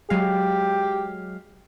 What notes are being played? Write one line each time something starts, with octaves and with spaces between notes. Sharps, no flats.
F#3 G#3 G4 F5